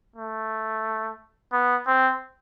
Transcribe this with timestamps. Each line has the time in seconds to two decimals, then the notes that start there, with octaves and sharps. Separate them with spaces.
0.16 A3
1.52 B3
1.87 C4